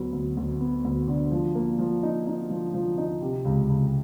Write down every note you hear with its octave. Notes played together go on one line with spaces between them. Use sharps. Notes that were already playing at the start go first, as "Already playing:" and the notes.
Already playing: D2 F#3 B3
D2
D2
B3
D2
D3
F3
A#3
F3
D#4
D#4
F3
F3
D#4
C3
C#2
C#2